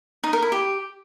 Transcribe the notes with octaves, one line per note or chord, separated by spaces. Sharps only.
D#4
A#4
E4
G4